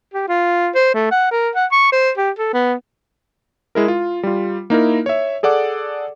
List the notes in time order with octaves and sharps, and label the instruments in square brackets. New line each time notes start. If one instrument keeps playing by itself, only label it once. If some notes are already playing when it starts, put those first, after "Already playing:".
[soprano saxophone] G4
F4
C5
A3
F#5
A#4
F#5
C#6
C5
G4
A4
B3
[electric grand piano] G#3 E4 A#4
F4
G3 F4
A#3 D#4 E4 A#4
C#5 E5
G#4 A4 D5 F#5 D6